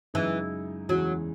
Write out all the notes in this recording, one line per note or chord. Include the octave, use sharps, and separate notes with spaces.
F#2 C#3 E3 G#3 D#4
E2 C#3 E3 F#3 G#3